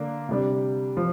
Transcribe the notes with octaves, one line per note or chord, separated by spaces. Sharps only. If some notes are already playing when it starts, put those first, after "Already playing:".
Already playing: D3 A#3 D4
C3 G3 D4
F3